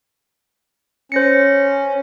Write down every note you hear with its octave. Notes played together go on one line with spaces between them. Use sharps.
C#4 C5 A#6 C#7